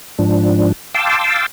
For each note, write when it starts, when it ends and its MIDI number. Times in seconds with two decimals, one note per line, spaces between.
0.19 0.72 44
0.19 0.72 53
0.19 0.72 62
0.95 1.46 77
0.95 1.46 79
0.95 1.46 81
0.95 1.46 84
0.95 1.46 86
0.95 1.46 88